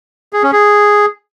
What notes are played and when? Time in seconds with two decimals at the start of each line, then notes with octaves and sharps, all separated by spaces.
0.33 G#4
0.43 C#4
0.53 G#4